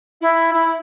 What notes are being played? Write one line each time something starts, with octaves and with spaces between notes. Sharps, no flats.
E4
E4